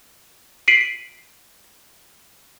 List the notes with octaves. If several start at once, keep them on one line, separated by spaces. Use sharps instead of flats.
B6 C7 D7 D#7 F#7